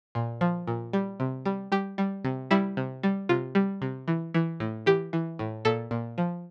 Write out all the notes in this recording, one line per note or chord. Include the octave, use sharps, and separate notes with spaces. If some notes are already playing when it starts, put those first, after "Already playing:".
A#2
F3
A#2
G3
C3
G3
G3 G4
G3
C3
G3 E4
C3
G3
C3 F4
G3
C3
E3
E3
A2
E3 G4
E3
A2
A#2 A4
A#2
F3